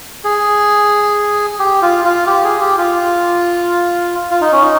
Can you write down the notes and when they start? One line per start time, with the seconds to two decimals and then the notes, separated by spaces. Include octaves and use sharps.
0.24 G#4
1.60 G4
1.82 F4
2.05 F4
2.27 G4
2.44 G#4
2.61 G4
2.78 F4
4.31 F4
4.41 D#4
4.52 C#4
4.62 D#4